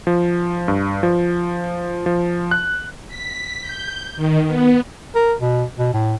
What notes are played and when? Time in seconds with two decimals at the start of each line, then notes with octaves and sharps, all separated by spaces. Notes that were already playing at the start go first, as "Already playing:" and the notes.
0.07 F3
0.68 G2
1.03 F3
2.06 F3
2.51 F#6
3.08 B6
3.62 G6
4.16 D#3
4.47 B3
5.15 A#4
5.41 B2
5.78 B2
5.94 A2